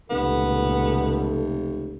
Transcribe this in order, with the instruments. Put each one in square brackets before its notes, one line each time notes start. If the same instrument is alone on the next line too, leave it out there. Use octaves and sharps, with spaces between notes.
[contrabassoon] F1 [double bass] C#2 A#2 [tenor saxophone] B3 [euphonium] A4